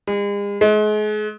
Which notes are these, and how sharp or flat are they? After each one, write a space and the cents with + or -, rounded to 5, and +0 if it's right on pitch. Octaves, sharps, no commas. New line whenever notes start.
G#3 -45
G#3 +35